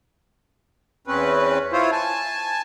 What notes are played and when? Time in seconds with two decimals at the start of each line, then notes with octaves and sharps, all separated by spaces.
1.07 E2 C4 C#4 B4
1.72 E4 F4 C5 C#5
1.92 G#5 A5